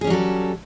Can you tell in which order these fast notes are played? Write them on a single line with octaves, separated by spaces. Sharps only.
G#4 C#4 G3 F#3 A4